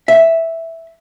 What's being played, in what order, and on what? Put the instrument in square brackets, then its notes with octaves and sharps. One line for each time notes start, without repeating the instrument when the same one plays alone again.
[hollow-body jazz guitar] E5